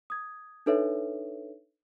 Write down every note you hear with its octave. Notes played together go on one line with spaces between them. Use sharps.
D#6 G#6
D4 D#4 A4 B4 C#5 E5